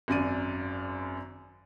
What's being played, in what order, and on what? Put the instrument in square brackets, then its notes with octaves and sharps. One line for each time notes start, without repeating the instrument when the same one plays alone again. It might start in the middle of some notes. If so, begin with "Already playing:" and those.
[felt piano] G#1 F#2 D5 D#7